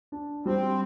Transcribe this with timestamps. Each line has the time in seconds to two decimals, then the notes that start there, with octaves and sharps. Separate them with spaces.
0.12 D4
0.46 G3 C4